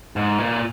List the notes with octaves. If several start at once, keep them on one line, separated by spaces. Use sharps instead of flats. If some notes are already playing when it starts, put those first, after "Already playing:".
G#2
A#2